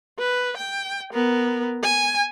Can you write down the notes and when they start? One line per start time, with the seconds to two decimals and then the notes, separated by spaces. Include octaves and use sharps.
0.19 B4
0.57 G5
1.13 B3 A#4
1.83 G#5